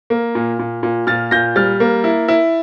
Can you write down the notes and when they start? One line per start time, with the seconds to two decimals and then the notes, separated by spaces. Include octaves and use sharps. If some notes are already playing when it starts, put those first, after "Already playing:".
0.10 A#3
0.35 A#2
0.59 A#2
0.83 A#2
1.07 A#2 F6 A6
1.31 A#2 G6 A#6
1.56 G3 F6 A6
1.80 A#3
2.04 E4
2.28 E4